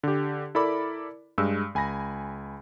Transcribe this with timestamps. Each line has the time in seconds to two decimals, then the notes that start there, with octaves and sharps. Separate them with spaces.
0.03 D3 G4
0.55 E4 A4 A#4 D5 B5 D6
1.38 G2 G#3 E6
1.75 C#2 G#5 B5 A#6